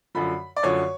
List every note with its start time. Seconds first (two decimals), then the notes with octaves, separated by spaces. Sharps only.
0.15 F#2 D3 F3 B5
0.56 D5
0.63 F#2 D3 F3 C#5